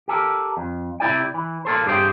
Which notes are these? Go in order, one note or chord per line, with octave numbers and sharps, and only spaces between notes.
G4 A4 A#4
F2
C3 E4 D5 G5
E3
A#3 A4 C5
G2 G4 G#4 C5 G5